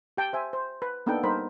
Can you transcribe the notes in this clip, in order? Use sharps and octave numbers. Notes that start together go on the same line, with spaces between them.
G4 G5 A5
C5 E5 G#5
C5
B4
A#3 B3 D4 D#4 A4 G5
G3 D#4 A#4 C5 B5